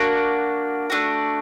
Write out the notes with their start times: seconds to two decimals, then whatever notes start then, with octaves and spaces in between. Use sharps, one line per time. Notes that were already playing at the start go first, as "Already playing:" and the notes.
Already playing: A#3 D4 F#4
0.90 A3 D4 F#4